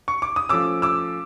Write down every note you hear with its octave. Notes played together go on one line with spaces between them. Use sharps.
C#6
D6
D#6
F3 A3 C#4 D6 E6
D6 E6